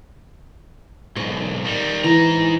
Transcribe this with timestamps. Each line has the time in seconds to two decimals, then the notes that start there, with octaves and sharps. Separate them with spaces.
1.16 B1 G#2 C#6
1.65 D#3 G3
2.04 G#2 E3 A#5